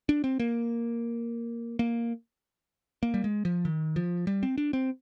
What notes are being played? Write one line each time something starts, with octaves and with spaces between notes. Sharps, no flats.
D4
C4
A#3
A#3
A#3
G3
G#3
F3
D#3
F3
G3
C4
D4
C4